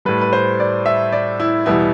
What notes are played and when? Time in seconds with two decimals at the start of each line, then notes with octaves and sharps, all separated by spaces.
0.05 A2 G3 B4
0.21 B4
0.33 C5
0.60 D5
0.86 E5
1.12 D5
1.40 E4
1.66 E2 B2 G3 E4